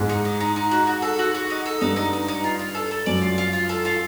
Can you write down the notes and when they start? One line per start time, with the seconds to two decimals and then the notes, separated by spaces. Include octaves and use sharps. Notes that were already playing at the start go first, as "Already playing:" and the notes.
Already playing: G#2
0.09 D#4
0.25 D#4
0.40 D#4
0.56 D#4
0.71 F#4
0.87 F#4
1.02 A4
1.19 F#4
1.34 F#4
1.50 D#4
1.66 A4
1.81 G2 D#4
1.96 D#4
2.13 D#4
2.28 D#4
2.44 F4
2.59 F4
2.75 A4
2.91 A4
3.06 F#2 D5
3.22 F4
3.38 F4
3.53 F4
3.69 A4
3.85 F4